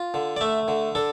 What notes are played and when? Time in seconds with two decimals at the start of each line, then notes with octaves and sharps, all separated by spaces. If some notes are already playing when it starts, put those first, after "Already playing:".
Already playing: F4
0.14 D3
0.37 D5
0.41 A3 E5
0.68 D3
0.95 D4 A4